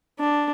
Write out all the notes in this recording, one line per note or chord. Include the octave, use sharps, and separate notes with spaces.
D4